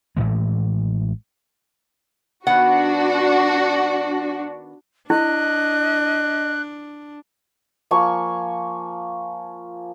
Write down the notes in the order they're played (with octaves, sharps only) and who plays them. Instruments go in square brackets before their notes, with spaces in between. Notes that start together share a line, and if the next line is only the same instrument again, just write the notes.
[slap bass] A1 A2 E3 G#3
[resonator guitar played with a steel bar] D#3 B3 F#5 [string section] D4 F#4
[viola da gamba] D4 [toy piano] E4 [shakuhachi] D#5 [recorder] F#6
[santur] F3 A#3 G#5 C#6